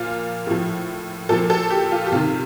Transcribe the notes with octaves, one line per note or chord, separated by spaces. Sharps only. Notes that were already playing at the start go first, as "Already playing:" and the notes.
Already playing: A#2 F3 F4
A2 F3
A#2 F3 A4
A4
G4
F4
G4
C3 D#3 F4